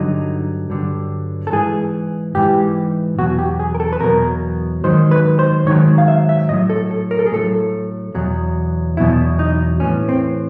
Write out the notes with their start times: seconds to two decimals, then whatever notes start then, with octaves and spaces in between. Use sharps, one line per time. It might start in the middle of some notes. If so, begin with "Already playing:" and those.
Already playing: G2 D3 F#3 D#4
0.70 G2 D3 F#3
1.47 A4
1.52 G#2 E3 G#4
2.35 G#2 E3 G4
3.19 E2 B2 F#3 F#4
3.39 G4
3.59 G#4
3.75 A#4
3.80 A4
3.93 B4
4.01 E2 B2 F#3 A#4
4.84 G#2 D#3 F#3 C5
5.11 B4
5.39 C5
5.66 G#2 D#3 F#3 C#5
5.98 F5
6.08 E5
6.29 E5
6.49 A2 F#3 D#5
6.70 A4
6.91 A4
7.11 A#4
7.19 A4
7.26 G#4
7.32 A2 F#3 A4
8.15 E2 B2 F#3
8.97 E2 B2 F#3 E4
9.39 D#4
9.80 A2 E3 C#4
10.09 C4